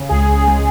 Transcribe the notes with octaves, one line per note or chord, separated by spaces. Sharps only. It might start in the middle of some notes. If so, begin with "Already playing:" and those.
Already playing: C#3
C#2 G#4
C#2
G#3 G#4